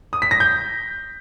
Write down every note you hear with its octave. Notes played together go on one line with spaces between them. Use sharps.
D#6
B6
A#6
G6